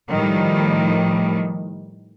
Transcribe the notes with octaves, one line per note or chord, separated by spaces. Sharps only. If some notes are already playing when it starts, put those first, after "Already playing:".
A2 D#3 F3 G3